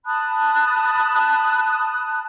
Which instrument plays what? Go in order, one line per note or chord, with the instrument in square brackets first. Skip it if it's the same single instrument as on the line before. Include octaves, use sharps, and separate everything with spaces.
[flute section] A5 B5 D#6 F#6